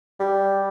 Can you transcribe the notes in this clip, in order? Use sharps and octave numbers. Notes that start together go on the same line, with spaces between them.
G3